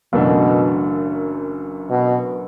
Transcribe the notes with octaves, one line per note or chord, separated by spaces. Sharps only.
F#1 F#2 B2 E3 A3 D4
B2